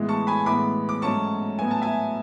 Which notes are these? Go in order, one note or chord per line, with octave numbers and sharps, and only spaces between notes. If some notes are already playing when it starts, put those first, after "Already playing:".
Already playing: A2 E3 G#3 B3
A5 C#6
G#5 B5
A2 E3 G#3 B3 B5 D6
D6
G#2 F#3 A3 C#4 A5 C#6
A2 F#3 B3 G#5
A5
E5 G#5